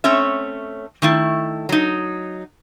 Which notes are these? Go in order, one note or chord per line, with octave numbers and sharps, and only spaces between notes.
A3 C4 C#4 C#5 E5
D#3 A3 E4
F#3 D#4